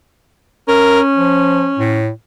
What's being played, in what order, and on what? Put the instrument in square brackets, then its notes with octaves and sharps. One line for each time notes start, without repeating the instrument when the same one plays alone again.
[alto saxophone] C#4 [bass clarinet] A#4
[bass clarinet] F3
A2